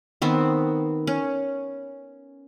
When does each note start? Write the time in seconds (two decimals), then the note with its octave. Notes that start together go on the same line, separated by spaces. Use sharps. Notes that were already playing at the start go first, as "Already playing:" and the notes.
0.22 D#3 B3 C4
1.07 C#4